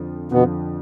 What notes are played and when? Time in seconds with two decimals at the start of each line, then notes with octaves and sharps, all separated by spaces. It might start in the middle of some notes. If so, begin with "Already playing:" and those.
Already playing: F2 D3 F3
0.32 F2 B2 D3 F3 B3